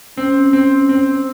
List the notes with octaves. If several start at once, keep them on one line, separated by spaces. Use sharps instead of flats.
C4 C#4
C4
C4